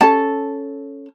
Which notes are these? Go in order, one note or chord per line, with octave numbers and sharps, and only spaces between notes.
C#4 A4 A5